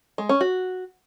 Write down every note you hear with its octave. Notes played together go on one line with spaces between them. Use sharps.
G#3
C#4
F#4